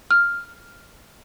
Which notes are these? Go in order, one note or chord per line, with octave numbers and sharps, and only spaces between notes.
F6